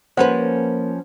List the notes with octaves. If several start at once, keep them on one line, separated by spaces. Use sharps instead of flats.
F3 A#3 C#4 B4 C5 F#5